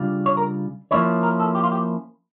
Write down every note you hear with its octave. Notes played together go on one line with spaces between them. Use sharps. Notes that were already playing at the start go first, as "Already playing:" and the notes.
Already playing: C#3 G3 D4 F4
C#5
A#4
F3 A#3 C#4 E4 C#5
A#4
A4
G4
F4
G4